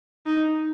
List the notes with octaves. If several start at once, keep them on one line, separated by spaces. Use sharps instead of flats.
D#4